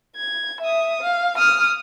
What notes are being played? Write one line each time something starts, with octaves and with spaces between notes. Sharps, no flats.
G#6
E5 D#6
F5
D#6 F6